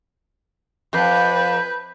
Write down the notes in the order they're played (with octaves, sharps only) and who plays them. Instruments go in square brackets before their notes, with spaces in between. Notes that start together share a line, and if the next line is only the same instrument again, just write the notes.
[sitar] F2 [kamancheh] B4 [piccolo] G6